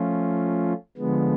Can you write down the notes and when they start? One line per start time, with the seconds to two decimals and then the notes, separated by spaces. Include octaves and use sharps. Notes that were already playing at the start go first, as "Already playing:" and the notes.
Already playing: F3 A3 C#4 F4
0.97 D3 F3 G#3 B3